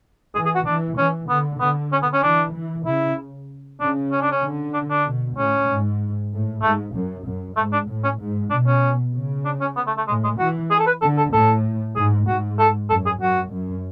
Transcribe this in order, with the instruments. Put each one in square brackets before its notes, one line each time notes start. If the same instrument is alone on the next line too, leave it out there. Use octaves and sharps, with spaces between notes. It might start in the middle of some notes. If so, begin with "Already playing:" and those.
[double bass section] E3 [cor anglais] G#4
[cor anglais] G#4
F#4
[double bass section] E3 [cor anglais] D4
[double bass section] E3 [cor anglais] C#4
[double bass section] D3 [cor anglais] B3
[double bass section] D3 [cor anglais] B3
[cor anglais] C#4
B3
C#4
[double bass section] E3 [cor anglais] D4
[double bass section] E3
[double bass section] C#3 [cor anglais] E4
[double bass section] C#3 [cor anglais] D4
[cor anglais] C#4
D4
C#4
[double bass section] D3
[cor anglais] D4
D4
[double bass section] B2
[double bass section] A2 [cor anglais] C#4
[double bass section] G#2
A2
[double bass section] G#2 [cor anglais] A3
[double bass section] F#2
F#2
[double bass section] G#2 [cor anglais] A3
[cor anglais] D4
[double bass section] A2
[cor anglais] C#4
[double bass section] G#2
[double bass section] B2 [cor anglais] D4
[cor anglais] C#4
[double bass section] C#3
[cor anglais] D4
C#4
B3
A3
A3
[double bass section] A2 [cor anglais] G#3
[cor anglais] G#3
[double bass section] E3 [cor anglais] F#4
[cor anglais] G#4
A4
B4
[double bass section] D3 [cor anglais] A4
[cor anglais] A4
[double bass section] A2 [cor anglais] A4
[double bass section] G#2 [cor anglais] G#4
[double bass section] G#2 [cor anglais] F#4
[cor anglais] A4
[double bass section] F#2 [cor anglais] A4
[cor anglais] G#4
[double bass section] F#2 [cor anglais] F#4
[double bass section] F#2